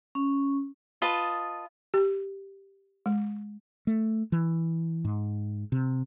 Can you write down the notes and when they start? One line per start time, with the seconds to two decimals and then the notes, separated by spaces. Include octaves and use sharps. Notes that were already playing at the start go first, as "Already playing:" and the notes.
0.15 C#4
1.02 F4 B4 D#5 A5
1.94 G4
3.06 G#3
3.87 A3
4.32 E3
5.05 G#2
5.72 C3